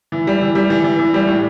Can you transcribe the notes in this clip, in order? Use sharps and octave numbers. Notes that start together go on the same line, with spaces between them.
E3
G3
E3
G3
E3
E3
E3
G3
A2